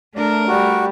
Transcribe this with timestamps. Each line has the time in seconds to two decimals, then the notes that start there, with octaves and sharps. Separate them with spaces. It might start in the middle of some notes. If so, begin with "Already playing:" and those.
0.16 A3 D4 A#4
0.48 G3 F#4